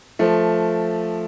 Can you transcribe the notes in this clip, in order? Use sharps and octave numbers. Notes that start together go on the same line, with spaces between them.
F3 A3